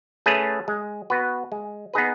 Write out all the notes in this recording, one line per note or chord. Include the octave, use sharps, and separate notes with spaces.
A3 C#4 G#4 B4
G#3
B3 F#4 B4
G#3
B3 D#4 G#4 B4